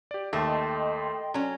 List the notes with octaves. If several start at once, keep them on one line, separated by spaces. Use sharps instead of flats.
G4 D5
D#2 A3 D#5 G5 C6 A6
F#3 C#4